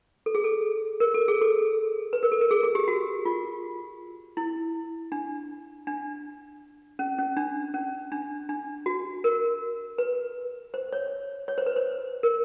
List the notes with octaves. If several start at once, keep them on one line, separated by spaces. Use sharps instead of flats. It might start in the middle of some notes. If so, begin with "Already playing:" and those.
A4
G#4
A4
A#4
A4
G#4
A4
B4
A#4
A4
A#4
G#4
G#4
G4
F#4
F4
E4
D4
D4
C#4
C#4
D4
C#4
D4
D4
F#4
A#4
B4
C5
C#5
C#5
C5
B4
C5
A#4